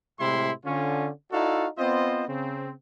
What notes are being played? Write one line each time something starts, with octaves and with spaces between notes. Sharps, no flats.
A2 C3 G#3 E4 C6
D3 C#4 F4
D#4 E4 F#4 A4 D5 F5
B3 C4 F4 C5 D#5
C#3 C4